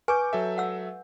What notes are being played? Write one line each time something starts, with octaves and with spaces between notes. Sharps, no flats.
B4 G#5 C#6 D6 G6
F#3 A4 E5
F#5 E6